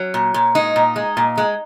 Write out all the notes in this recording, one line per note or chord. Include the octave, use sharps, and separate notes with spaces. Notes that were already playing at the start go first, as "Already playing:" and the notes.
Already playing: F#3 C#4
A#2
A#2
G#3 D#4
A#2
G#3
A#2
G#3